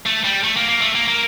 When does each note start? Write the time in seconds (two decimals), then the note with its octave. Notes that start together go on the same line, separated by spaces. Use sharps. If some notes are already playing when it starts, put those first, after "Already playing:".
0.06 A3
0.24 G3
0.44 A3
0.57 A#3
0.69 A#3
0.82 A3
0.96 A#3
1.08 A#3